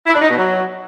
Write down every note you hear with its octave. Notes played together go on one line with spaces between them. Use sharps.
E4
D4
D#4
B2
F#3